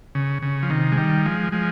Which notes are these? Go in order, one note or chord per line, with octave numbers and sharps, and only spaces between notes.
C#3
C#3
F3
C3 D#3
G#3
D#3 G3
F3 G#3
F3 G#3